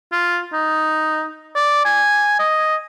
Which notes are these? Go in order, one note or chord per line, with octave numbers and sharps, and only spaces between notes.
F4
D#4
D5
G#5
D#5